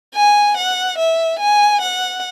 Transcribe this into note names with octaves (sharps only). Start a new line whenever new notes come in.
G#5
F#5
E5
G#5
F#5